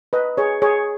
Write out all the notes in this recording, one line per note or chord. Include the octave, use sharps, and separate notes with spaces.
B4 D#5
G#4 C#5
G#4 C#5